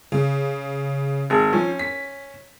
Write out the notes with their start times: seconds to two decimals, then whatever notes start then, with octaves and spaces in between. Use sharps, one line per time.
0.12 C#3
1.30 G#1 G#4
1.53 F3 C#4
1.79 B6